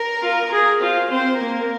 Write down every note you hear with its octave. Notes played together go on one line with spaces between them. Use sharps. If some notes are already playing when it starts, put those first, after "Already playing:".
Already playing: A#4
F4
G#4
F4 C5
C4 C5
A#3 A#4